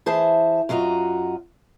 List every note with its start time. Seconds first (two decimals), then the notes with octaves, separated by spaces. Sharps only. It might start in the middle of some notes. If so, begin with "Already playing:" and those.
0.06 E3 G#4 C5 E5 A5
0.69 F#2 F4 F#4 D#5 A#5